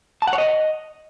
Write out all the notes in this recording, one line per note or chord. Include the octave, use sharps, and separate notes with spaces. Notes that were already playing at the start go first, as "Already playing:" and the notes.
A5
F#5
C#5
D#5